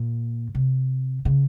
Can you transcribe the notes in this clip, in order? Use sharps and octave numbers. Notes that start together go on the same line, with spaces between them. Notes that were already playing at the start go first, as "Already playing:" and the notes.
Already playing: A#2
C3
C#3